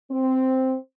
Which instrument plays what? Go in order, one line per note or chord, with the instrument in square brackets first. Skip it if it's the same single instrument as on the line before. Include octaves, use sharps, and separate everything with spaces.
[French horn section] C4